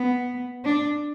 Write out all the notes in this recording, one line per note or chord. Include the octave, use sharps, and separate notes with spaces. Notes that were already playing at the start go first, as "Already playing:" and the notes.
Already playing: B3
D4